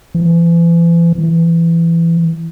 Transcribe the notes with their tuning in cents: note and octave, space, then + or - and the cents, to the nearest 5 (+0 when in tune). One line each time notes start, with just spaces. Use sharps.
E3 +40
E3 +20